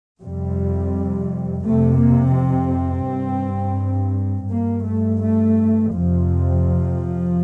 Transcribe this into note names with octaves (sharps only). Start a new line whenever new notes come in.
F2 C3 G3
F2 C3 A3
A#3
C4
G2
G2 A#3
A3
A3
F2 C3 F3